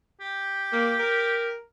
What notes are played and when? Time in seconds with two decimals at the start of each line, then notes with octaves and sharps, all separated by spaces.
0.21 G4
0.73 A#3
0.99 A#4